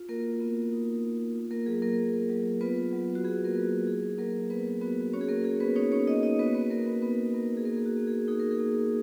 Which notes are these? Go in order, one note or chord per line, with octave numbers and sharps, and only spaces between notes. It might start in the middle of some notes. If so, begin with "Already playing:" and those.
Already playing: F4
A#3 F#4 A#4
B3
D#4
B3
F4
A#3 A#4
F#3 G#4
A#3 A#4
A#3
F#3
B3 F4 B4
F#3
F#4
B3 G#4
A#3 A#4
F#3
F#4
D#4 G#4
F#3 A#3 A#4
B3 B4
B3 F#4 B4
C#4 F#4 C#5
G#4
A#3 A#4
A#3 G#4
B3 B4
C#4 D#4 C#5
C#4 C#5
A#3 D#4 D#5
D#4 D#5
B3 F#4 B4
B3 B4
A#3 B3 A#4
B3 B4
B3 D#4 B4
A#3 B3 A#4
G#4
A#3 F#4 A#4
G#4
F#4
A#3
G#4
D#4 G#4
A#4
G#4
A#3